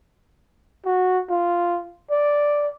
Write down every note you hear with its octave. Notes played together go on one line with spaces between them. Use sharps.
F#4
F4
D5